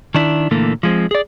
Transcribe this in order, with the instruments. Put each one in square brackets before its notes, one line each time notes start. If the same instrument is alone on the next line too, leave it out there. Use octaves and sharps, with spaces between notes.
[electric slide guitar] D#3 D4 E4
A#2 D3 E3 A3 A#3
F3 G#3 C4
G#4 D5